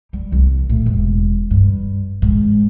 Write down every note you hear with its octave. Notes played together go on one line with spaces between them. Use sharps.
G3
C2
A2
E1
G2
G#2